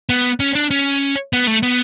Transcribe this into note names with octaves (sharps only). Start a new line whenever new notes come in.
B3
C#4
D4
C#4
B3
A3
B3